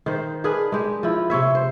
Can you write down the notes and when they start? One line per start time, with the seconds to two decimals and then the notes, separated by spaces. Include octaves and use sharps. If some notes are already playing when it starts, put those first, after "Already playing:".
0.06 D#3 C5
0.44 D4 G#4 A#4 B4
0.72 G#3 G4
1.03 F3 E4
1.30 C3 C4 C#5 E5
1.55 C5